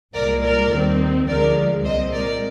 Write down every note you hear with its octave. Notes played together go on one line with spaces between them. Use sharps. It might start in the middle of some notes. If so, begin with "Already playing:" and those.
C2 A#2 G#3 A#4 D5
A#4 D5
D#2 D#3 G3 C4
D2 D3 F3 G#3 A#4 D5
C2 A#2 G#3 C4 C5 D#5
A#4 D5